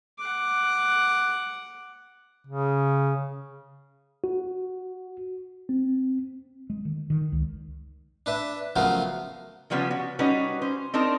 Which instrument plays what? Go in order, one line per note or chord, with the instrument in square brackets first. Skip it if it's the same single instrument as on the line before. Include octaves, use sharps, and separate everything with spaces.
[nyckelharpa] F#5 D6
[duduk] C#3
[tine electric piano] F#4
C4
[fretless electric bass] G#3
D#3
D#3
C#2
[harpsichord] D4 B4 E5
C#3 F3 F#3 A3 B3 A#4
[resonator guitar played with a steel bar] C#3 F3 G3 B3 C#4
F#4
G3 C#4 D#4 F#4 B4
C#4 C5
C4 D4 D#4 A#4 D5